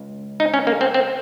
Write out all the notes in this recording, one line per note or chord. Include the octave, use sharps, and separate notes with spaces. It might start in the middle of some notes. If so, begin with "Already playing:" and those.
Already playing: C#2
D#4
C#4
A#3
C4
C4